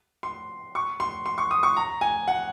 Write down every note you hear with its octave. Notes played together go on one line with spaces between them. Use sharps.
C6
C#6
C6
C6
C#6
D#6
C#6
A#5
G#5
F#5